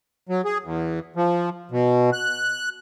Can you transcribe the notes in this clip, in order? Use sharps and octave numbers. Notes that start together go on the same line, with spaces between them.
F#3
G#4
E2
F3
B2
F#6